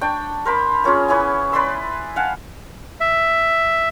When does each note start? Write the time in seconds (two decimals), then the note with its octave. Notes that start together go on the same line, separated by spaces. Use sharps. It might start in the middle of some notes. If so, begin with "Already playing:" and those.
0.01 D4 G5 C#6
0.45 A#4 C5 B5 D6
0.84 A#3 C#4 F4 G#4
1.08 B3 C#4 E4 G#5
1.52 B4 D5 C6 E6
2.16 F5 F#5 G#5 A5
3.01 E5